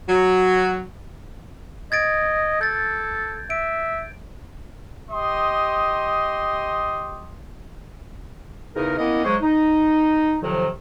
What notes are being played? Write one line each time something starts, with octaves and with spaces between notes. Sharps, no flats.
F#3
D#5 G#6 A6 D7
A4 G6 A6
E5 D7
G4 D#5 C6 D#6
E2 C#3 D#4 A#4
A#3 B3 C#4 E4 D#5
C#3 F#3 G#3 C5 C#5 C#6
D#4
F2 C3 D#3 F3 F#3